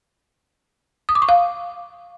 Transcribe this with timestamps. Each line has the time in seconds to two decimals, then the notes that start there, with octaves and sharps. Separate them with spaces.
1.09 D#6
1.15 D6
1.22 C#6
1.29 F5